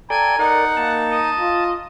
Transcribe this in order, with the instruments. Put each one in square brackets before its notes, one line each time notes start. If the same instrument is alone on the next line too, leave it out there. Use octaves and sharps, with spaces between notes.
[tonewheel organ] A4 D5 G5 [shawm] G#5 [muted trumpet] A#5
[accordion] D#4 [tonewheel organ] A#4 D5 [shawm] F#5
[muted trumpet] A#3 [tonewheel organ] A5
[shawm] D#5
[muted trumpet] F4